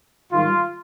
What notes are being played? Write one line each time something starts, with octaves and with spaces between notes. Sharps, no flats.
G#2 D#3 G3 F4